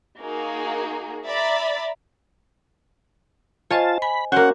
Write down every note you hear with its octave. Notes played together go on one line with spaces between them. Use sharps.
A#3 D#4 F#4 G#4
D5 E5 A#5 B5 A6
F4 C5 C#5 D#5 G#5 A5
G#5 B5
A#3 C#4 F#4 C5 F#5